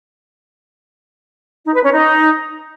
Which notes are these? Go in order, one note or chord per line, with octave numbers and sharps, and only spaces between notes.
D#4
B4
C#4
D#4